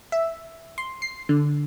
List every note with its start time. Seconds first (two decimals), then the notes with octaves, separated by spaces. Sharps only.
0.12 E5
0.78 C6
1.02 C7
1.29 D3